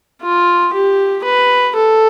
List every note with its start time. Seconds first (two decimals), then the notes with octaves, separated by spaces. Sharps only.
0.22 F4
0.73 G4
1.24 B4
1.76 A4